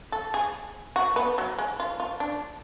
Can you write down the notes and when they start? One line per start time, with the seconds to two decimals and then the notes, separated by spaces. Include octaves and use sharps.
0.12 A4
0.34 G#4
0.96 F#4
1.16 B3
1.38 F#3
1.59 G#3
1.80 F4
2.00 F4
2.20 D4